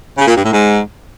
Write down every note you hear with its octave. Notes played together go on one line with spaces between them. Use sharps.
C#3
A#2
G2
A2
G#2